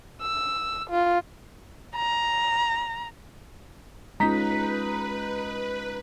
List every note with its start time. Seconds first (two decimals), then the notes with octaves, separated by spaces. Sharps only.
0.21 E6
0.90 F4
1.96 A#5
4.20 G#3 C#4 D#4 F4 B4 A#5 B6